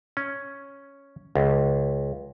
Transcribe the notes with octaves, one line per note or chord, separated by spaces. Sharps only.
C#4
C#2